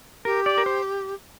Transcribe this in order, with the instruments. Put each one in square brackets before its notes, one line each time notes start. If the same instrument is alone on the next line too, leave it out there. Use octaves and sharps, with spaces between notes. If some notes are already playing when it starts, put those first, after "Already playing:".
[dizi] G4 [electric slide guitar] A#4
[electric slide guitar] D5
A#4
C5